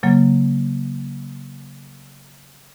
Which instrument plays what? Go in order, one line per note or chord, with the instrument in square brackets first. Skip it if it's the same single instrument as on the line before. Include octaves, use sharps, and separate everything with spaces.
[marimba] C#3 F#3 A#3